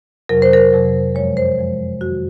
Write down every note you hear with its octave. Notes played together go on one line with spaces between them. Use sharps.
F2 C3 F#3 A#4
C5
A#4
F2 C3 F#3
F#2 F3 G#3 C#5
C5
F#2 F3 G#3
F2 D#3 F#3 F#4